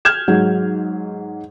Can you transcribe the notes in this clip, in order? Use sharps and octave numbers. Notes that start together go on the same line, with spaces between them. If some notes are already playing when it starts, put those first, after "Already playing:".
F6 G6 G#6 E7
G#2 F#3 G#3